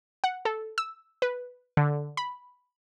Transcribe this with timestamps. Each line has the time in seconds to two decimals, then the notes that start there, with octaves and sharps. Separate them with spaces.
0.24 F#5
0.45 A4
0.78 E6
1.22 B4
1.77 D3
2.17 B5